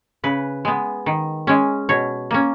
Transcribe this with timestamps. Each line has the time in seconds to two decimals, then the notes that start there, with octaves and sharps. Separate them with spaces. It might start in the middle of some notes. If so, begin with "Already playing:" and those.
0.24 C#3 B4
0.65 G#3 B3
1.06 D#3
1.47 G#3 C#4
1.89 B2 C#5
2.31 A#3 C#4